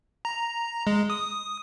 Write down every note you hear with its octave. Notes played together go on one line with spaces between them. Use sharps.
A#5
G#3
D#6